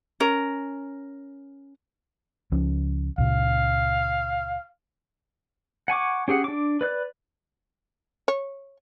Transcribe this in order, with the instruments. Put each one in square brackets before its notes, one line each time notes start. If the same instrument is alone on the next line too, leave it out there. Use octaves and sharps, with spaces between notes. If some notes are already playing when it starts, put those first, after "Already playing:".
[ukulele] C#4 A#4
[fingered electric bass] C#2 F3 C#4
[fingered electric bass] C#2 A#2 C#3 [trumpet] F5
[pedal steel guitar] F#5 G#5 C#6 D6
C#4 G4 G#4 F#5
D4 D6
B4 D5 F#6
[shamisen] C#5